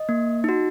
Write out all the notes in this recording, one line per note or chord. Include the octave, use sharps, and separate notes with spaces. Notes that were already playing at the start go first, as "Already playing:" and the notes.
Already playing: D#5
A#3
D#4 F#4